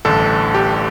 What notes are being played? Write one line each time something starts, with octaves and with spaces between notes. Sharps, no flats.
A1 G2 D3 A4
G4